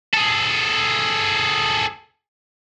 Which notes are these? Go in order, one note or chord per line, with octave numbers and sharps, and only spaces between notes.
G#4 A4